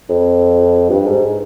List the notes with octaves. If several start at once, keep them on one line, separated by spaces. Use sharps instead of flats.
F2
G2
G#2